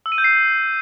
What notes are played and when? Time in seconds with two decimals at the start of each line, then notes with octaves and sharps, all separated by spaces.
0.06 E6
0.12 D#7
0.18 G6
0.24 C7